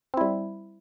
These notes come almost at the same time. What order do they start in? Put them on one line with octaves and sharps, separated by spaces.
C4 E4 G3